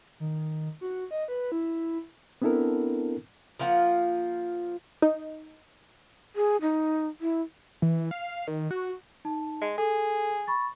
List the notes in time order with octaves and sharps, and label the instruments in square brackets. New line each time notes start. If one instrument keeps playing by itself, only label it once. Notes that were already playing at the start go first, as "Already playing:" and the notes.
[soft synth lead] D#3
F#4
D#5
B4
E4
[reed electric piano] B3 C4 D4 E4 A4 A#4
[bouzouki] F3 A#3 F4 F#5
[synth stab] D#4
[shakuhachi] G#4
D#4
E4
[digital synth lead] E3
F5
D#3
F#4
[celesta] D#4 A5
[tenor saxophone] G#3
[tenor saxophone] G#4 [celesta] A4
[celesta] B5 C#6 A6